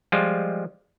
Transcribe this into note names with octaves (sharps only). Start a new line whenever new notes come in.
F3 G3 G#3 F4